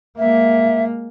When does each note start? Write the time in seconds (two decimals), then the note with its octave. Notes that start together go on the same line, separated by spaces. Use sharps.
0.19 G#3 A#3 E5